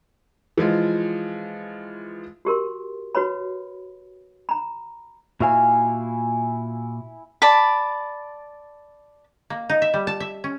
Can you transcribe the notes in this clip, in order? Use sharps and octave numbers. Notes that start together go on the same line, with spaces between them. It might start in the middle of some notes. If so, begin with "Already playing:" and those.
E3 F3 G#3 F4
F#4 G4 A#4 C6
F#4 B4 C#5 B5
A#5 B5
A#2 E4 F#4 F5 G#5
D5 A5 B5
A#3
D#4
E5
G3
A5
E5
C#4